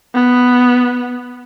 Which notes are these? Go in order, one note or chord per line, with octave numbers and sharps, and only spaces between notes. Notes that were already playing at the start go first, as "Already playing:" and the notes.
B3